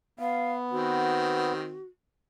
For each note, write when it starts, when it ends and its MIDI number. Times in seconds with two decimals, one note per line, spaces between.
0.19 1.53 59
0.19 0.53 77
0.71 1.78 51
0.71 1.78 60
0.71 1.83 66